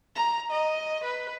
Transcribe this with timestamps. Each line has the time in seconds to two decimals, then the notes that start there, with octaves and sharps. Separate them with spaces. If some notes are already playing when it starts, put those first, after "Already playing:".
0.16 A#5
0.52 D#5
1.05 B4